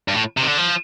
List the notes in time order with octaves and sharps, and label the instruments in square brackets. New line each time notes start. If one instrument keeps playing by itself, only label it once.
[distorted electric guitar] G2
A2
C3
D#3
D3
F3